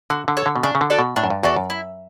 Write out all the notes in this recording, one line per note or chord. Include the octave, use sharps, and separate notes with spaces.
D3 F#4
D3
A4 C#5
D3
B2
C#3 D4
C#3
D3
F#4 A4 D5
B2
A2 D4
F#2
G2
E2 F#4 A4 D5
F#2
E4